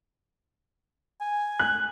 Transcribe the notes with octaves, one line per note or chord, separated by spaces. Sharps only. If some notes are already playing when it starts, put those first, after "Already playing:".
G#5
F#6